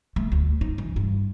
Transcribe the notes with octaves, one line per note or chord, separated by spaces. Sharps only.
A3
D2
D#4
E3
G2